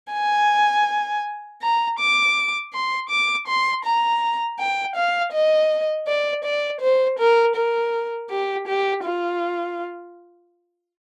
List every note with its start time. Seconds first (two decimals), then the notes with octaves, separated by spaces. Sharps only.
0.13 G#5
1.62 A#5
1.99 D6
2.73 C6
3.10 D6
3.47 C6
3.85 A#5
4.59 G5
4.96 F5
5.33 D#5
6.07 D5
6.44 D5
6.81 C5
7.19 A#4
7.56 A#4
8.30 G4
8.67 G4
9.04 F4